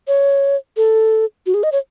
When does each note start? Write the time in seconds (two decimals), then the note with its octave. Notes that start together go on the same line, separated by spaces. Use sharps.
0.08 C#5
0.77 A4
1.46 F#4
1.54 G#4
1.63 D#5
1.72 C#5